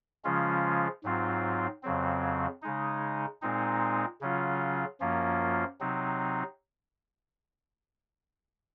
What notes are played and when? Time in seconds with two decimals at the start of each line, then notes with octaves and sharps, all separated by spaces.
0.24 C#3 F3 G#3 C#4 F4
1.04 G#2 F#3 C4 F4
1.83 F2 C#3 F#3 C4
2.62 C#3 G#3 D#4
3.42 A#2 G#3 C4 D#4
4.21 C#3 F#3 C#4 F4
5.00 F#2 F3 A#3 C#4 F4
5.80 C3 F#3 C4 D#4